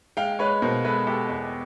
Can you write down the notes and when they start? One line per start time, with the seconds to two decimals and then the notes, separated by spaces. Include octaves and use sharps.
0.17 G#3 F5 G5
0.39 G#3 B4 C#5
0.62 B2 A#4 C5
0.85 G#3 A4 B4
1.07 G#3 G4 A4
1.29 E2